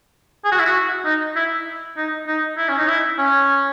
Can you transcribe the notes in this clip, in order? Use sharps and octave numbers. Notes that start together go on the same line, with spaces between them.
G#4
F#4
E4
F#4
D#4
E4
D#4
D#4
E4
C#4
D#4
E4
C#4